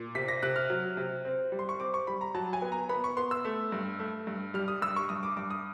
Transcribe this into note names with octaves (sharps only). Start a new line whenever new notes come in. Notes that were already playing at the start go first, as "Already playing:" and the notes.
Already playing: A#2
C3 B6
A#6
C3 F#6
F6
F#3
C3
C4
G3
C6
C#6
C4 D6
C#6
G3 B5
A#5
F#3 A5
G#5
B3
A#5
B3 B5
C#6
B3 C6
E6
A3
G2
A3
G2
G3 F6
D#6
G2 E6
C#6
G2 D#6
D6
G2 D6
D#6